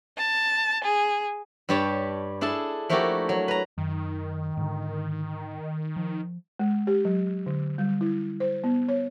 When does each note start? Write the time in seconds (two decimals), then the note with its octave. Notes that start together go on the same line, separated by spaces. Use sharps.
0.18 A5
0.84 G#4
1.69 G2 G3 G4 C#5 A5
2.41 D4 E4 G#4 A4 A5
2.90 F3 A3 A#3 E4 F#4 G4
3.29 F#3
3.48 B4 A#5
3.78 F#2 D#3
4.57 G#2 D3
5.96 F3
6.59 G#3
6.87 G4
7.05 F#3
7.46 D3
7.78 G3
8.01 E4
8.40 C5
8.64 B3
8.89 C#5